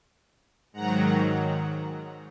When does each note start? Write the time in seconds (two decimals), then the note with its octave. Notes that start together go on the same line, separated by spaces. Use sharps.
0.73 G#2 D#3 F#3 F#5 A#5